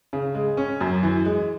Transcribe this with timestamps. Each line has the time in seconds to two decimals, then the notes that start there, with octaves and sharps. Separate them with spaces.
0.13 C#3
0.35 G#3
0.57 C#4
0.81 F#2
1.03 E3
1.25 G#3